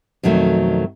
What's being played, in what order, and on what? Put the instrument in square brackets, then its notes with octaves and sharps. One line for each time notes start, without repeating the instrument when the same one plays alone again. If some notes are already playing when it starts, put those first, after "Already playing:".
[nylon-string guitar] F2 B2 D#3 F#3 A3